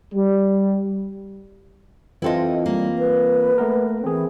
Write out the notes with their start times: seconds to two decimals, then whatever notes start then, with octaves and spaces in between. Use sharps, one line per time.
0.14 G3
2.22 E3 C4 E4 F4 A4 D#5
2.66 G3 A#3
2.99 B4
3.58 A3 B3 A#4
4.04 E3 C4 G#4